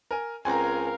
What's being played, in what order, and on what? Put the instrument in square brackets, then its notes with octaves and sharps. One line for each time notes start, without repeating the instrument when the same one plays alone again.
[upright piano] A#4 G#5
[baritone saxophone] C#2 [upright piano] C4 [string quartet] A#4 F5 [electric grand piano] G#5 A#5